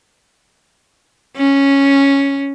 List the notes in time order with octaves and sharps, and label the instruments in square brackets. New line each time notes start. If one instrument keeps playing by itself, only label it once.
[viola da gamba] C#4